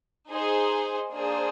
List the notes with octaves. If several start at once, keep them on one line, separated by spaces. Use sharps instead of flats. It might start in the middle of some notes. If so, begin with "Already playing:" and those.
D#4 G#4 C5
A#3 D4 G#4 C5